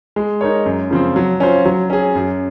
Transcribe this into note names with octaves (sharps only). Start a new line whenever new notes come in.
G#3
D#4 A#4 C#5
F#2
C#3 F3 C4
F#3
C#4 F4 C5
F#3
C#4 G#4
F#2